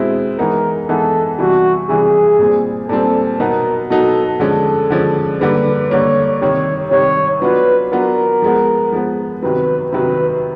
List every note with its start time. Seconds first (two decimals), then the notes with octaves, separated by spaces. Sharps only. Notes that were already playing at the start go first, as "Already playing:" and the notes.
Already playing: B2 G#3 C4 E4
0.38 E3 G#3 B3 D#4 A#4
0.89 E3 G#3 B3 D#4 A4
1.39 C3 E3 G3 F#4
1.89 C3 E3 G3 G#4
2.39 A#2 G3 C4
2.89 A#2 G3 C4 A4
3.40 B2 F#3 B3 D#4 A#4
3.90 B2 F#3 B3 D#4 A4
4.40 D3 F3 G#3 C#4 A4
4.90 D3 F3 G#3 C#4
5.41 D3 G3 A#3 B4
5.91 D3 G3 A#3 C#5
6.41 C3 D#3 G3 C#5
6.91 C3 D#3 G3 C#5
7.42 F#3 B3 D4 F4 B4
7.92 F#3 B3 D4 F4 A#4
8.42 F3 G#3 B3
8.92 F3 G#3 B3
9.42 C3 D#3 F#3 B4
9.93 C3 D#3 F#3 B4